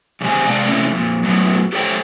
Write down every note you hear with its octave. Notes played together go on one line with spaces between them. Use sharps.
E2 C#3 G3 C4 G4 G#5
C3 G#3 D5 F5 G5 A5
C3 E3 G#3 A3 C4 C#4
F2 A#2
F#2 A2 F#3 B3
G4 A4 C5 C#5 F#5 G5